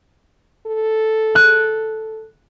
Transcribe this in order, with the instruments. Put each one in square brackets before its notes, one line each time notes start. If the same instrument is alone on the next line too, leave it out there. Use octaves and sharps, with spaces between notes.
[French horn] A4
[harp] F#6